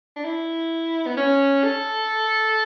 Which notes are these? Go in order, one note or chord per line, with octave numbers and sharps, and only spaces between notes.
D4
E4
B3
C#4
A4